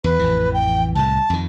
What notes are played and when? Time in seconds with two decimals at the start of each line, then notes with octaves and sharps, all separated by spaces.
0.04 E2 B4
0.19 A1 F2 E3
0.54 G5
0.95 C2 A2 A5
1.30 F2 D#3